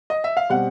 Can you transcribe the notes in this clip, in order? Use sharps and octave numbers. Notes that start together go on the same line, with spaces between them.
D#5
E5
F5
B2 G3 C4 F#5